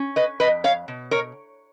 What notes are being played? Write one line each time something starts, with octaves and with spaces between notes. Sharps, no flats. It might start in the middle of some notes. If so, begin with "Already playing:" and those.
Already playing: C#4
B4 D#5
F2 B4 D#5
C#5 F5
B2
A#4 C#5